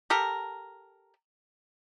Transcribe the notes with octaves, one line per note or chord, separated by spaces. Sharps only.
G4 A4 A#4